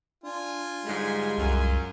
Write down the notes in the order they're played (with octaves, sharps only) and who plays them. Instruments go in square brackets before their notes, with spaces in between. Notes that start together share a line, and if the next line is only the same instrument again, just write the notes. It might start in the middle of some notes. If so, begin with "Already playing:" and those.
[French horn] D4 [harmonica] F4 G#5
[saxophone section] G#2 D3 G3 [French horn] G#3
[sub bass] C2 [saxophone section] F#2